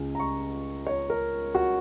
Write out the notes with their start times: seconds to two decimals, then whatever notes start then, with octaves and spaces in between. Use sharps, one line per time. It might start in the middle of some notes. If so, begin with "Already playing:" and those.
Already playing: C#2 C#3 G#3
0.15 A#5
0.20 C#6
0.87 C#5
1.10 A#4
1.55 F#4